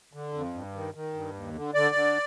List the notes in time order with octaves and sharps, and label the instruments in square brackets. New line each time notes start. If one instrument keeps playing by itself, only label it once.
[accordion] D3
F2
G2
D#3
D#3
G2
D#2
D3
D3 D5
D3